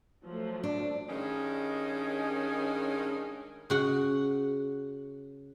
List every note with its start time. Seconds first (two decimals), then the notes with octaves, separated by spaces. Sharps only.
0.25 F3 F#3 A3
0.64 D4
1.10 G2 D#3 G#3 C#4
3.70 C#3 F#4 F#5